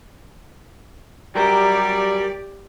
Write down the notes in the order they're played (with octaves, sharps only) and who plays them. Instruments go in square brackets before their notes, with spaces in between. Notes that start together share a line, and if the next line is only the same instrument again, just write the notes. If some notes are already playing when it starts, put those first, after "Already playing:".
[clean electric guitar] F#3 A#4 [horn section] G3 [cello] G4 D5